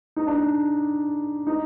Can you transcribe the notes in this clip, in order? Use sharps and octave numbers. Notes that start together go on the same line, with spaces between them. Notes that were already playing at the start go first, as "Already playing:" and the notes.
D#4
D4
D#4
D#4